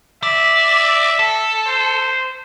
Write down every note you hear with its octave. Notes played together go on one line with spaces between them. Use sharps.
D5 E5
A4
C5